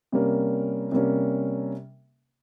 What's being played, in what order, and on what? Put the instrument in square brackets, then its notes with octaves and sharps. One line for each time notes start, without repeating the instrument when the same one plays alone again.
[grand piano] C3 G3 A#3 C#4
C3 G3 A#3 C#4